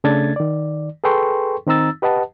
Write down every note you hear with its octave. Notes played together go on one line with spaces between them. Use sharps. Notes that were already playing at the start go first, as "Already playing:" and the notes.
C#3 A3 D4 G#6 A6
D#3 D5
G#4 A4 B4 G5 C6 C#6
D#3 C4 D#4 A#5 E6 A6
G4 B4 D#5 F#5 A5